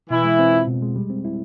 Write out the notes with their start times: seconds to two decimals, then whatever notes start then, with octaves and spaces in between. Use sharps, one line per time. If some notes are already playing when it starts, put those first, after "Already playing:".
0.10 B2 E3 E4
0.25 G#3
0.39 C4
0.53 F4
0.67 B2
0.82 G#3
0.96 G3
1.10 C4
1.25 E4